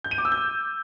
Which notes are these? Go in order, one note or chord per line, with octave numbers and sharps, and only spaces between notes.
G6
D#7
D6
E6
G6